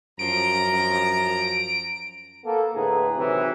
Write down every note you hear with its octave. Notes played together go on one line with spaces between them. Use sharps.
F#2 F3 A#5 D7
A#3 B3 A4
A2 D3 G#4 B4 A#5
C3 D#3 E3 F#3